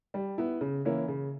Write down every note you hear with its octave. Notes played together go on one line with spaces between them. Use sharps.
G3
B3 E4
C#3
E3 A#3 C#4 E4
C#3